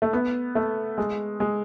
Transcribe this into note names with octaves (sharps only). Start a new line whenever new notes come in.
A3
B3
A3
G#3
G#3